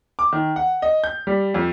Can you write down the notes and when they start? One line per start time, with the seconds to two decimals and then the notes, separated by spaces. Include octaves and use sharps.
0.19 D6
0.33 D#3
0.56 F#5
0.82 D#5
1.04 G6
1.27 G3
1.54 F2